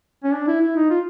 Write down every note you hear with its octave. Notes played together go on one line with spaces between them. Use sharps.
C#4
D4
E4
E4
D#4
F4